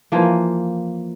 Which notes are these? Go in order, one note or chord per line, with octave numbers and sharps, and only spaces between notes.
E3 F3 A#3